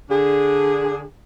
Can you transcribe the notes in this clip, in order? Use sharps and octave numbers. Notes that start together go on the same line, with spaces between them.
D3 D4 G#4